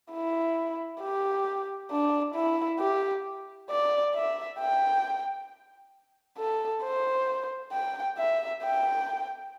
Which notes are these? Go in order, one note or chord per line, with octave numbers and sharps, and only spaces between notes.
E4
G4
D4
E4
G4
D5
E5
G5
A4
C5
G5
E5
G5